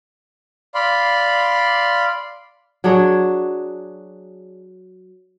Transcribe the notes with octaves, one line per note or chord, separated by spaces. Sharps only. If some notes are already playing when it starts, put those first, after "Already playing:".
D5 F5 B5 C6
F#3 D4 G#4 C#5